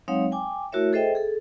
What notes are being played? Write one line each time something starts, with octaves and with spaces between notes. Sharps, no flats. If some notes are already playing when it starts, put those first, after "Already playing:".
F#3 G#3 C4 D#4 C#5 F5
G5 G#5 D6
A3 E4 F#4 A#4 C#5 E5
G#4 A4 C5 D#5 E5 G5
G#4 A4